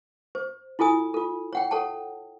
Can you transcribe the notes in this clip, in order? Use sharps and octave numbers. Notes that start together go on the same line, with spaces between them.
C5
E4 F4 A4 G#5 D#6
F4 A4
C#5 F#5 G5
A4 C#5 F#5 A5